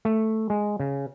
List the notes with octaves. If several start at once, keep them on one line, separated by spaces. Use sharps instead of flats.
A3
G#3
C#3